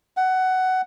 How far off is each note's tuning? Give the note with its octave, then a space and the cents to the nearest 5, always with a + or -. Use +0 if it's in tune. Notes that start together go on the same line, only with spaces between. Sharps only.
F#5 +15